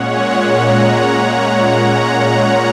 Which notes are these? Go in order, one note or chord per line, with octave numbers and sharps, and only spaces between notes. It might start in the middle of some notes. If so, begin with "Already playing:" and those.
Already playing: A#2 G#3 C#4 C#5 F#5
F#5 A#5
F#5 A#5
F#5 A#5